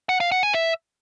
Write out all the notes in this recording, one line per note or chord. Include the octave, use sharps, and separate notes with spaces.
F#5
F5
F#5
G#5
E5